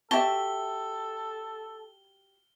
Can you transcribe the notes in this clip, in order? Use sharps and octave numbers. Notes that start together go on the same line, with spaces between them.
F#4 G4 A4 E5 A5 G7